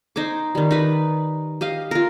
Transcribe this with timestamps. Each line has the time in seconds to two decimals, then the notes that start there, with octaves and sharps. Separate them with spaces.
0.16 D#4 C5 G#5 D6
0.55 D#3 G3
0.71 D#4 B4
1.61 G4 D#5 F5
1.91 F4 A#4